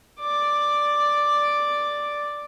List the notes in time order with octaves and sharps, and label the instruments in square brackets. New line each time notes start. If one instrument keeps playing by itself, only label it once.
[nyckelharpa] D5 D6